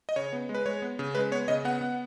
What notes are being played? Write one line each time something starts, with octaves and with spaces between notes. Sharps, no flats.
D#5
C#3 C#5
B3
G#3
B4
G#3 C#5
B3
C#3
G#3 B4
B3 C#5
C#3 D#5
B3 F#5
B3